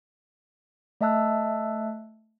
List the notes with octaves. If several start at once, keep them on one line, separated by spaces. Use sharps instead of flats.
A3 D#5 E5 A5 E6 F#6